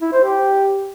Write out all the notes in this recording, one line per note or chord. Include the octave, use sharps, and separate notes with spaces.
E4
C5
G4